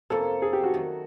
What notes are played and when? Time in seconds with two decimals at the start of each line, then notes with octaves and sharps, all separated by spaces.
0.10 F2 C3 F3 A#3 C#4 A4
0.42 G#4
0.53 G4
0.63 F#4
0.74 D#3 F#3 A3